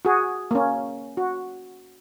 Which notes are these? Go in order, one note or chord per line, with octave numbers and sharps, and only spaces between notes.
F#4 G#4
A#3 C#4
F#4